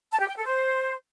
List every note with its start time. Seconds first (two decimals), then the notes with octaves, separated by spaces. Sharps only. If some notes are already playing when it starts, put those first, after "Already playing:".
0.11 A5
0.20 G4
0.28 G5
0.37 A4
0.45 C5